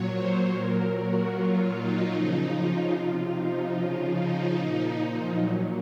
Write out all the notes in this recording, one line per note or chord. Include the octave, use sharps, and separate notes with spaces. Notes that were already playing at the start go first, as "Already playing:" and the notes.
Already playing: A#2 F#3 C#5
C5
A#2 F#3 A#4
F#4
A#2 F#3 F4
D#4
C#3 F3
F4
C3 F3
D#4
C#3 F3 F4
D#4
A#2 F3
A#2 F#3